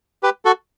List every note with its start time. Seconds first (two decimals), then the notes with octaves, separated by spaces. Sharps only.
0.23 G4 B4
0.45 F#4 A4